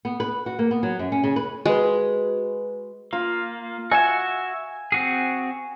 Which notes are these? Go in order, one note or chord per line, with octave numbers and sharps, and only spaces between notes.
B3
B4
F#4
A#3
B3
F#3
F#2
C#4
C#3
B4
G#3 F#4 B4
A#3 F4
F#4 E5 G#5 E6
C4 F#4 G#4